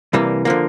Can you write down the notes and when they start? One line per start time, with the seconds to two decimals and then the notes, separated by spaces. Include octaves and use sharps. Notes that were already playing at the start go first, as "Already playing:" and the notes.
0.13 C2 C3 E3 G3 A#3
0.45 D3 F3 A#3